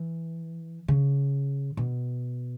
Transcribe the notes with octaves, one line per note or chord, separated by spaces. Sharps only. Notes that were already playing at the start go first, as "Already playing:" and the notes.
Already playing: E3
C#3
B2